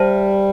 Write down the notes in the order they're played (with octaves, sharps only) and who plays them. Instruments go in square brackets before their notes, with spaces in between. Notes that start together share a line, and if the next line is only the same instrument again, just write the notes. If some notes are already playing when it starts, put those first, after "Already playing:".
Already playing: [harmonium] G3 [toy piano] C5 E5 A5